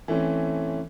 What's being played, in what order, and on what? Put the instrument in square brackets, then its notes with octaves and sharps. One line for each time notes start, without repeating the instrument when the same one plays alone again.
[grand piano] E3 A3 C4 C#4